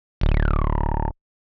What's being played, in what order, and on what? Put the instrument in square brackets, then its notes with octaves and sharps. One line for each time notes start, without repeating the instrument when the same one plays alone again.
[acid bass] D1